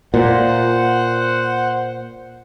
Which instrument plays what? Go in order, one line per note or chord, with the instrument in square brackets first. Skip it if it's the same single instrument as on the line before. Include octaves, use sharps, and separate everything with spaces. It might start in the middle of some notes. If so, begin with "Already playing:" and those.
[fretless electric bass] A#2 [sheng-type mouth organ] C5 F#5